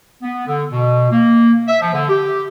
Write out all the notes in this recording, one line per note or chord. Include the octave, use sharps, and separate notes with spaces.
B3
D3
B2
A#3
E5
F3
D3
G4